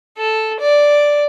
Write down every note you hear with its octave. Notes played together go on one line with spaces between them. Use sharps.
A4
D5